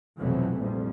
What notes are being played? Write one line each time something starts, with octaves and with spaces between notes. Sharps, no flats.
B1 F2 C3 E3 F#3 A3
A#1 F2 G3